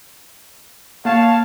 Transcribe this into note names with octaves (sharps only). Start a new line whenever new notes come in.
A#3 C#5 F5 A5